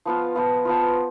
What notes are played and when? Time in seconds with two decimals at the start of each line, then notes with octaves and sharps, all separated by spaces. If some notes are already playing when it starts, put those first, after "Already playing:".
0.05 F3 B3 F4
0.35 F3 B3 F4
0.65 F3 B3 F4